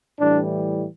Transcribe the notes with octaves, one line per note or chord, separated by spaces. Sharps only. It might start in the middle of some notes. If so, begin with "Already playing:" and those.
A2 E3 G3 D4